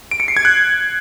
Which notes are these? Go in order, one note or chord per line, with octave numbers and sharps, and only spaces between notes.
D7
C#7
C7
G#6
F#6